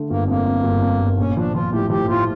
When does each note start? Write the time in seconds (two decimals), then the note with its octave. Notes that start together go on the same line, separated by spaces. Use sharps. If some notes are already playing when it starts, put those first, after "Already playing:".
Already playing: D3 A3
0.10 G1 A#3
0.28 F2 A#3
0.46 F2
0.63 G1
0.82 F2
1.00 G1
1.18 A#1 C#4
1.36 F3 D4
1.54 F3 F4
1.72 A2 G4
1.90 F3 G4
2.08 A2 F4